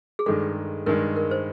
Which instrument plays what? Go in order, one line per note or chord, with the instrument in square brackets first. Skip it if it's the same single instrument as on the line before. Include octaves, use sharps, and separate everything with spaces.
[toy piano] G#4
[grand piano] G2 D#3 G#3 [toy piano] A4
[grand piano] G2 D#3 G#3 [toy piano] A#4
[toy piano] A#4
C5